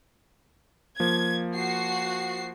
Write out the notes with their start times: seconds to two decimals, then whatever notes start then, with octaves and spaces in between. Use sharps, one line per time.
1.00 F3 A#3 G#6
1.55 F#4 C7